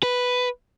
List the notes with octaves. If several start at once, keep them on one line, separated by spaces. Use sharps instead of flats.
B4